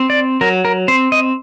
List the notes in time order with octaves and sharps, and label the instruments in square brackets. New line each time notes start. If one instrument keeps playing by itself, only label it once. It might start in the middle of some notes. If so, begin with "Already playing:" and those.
Already playing: [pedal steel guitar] C4
D5
F#3 A#4
A#4
C4 C5
D#5